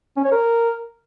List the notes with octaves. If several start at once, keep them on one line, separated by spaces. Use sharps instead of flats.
C#4
C#5
A#4